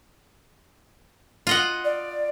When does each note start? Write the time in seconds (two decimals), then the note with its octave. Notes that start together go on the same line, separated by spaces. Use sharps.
1.47 F4 D#5 F#5
1.84 D5